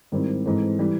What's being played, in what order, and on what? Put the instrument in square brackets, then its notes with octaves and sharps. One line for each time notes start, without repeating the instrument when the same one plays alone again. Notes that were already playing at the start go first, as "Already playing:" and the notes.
[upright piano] G#2 D#3 G3 C4 E4
G#2 E3 A3 C4
E3 G3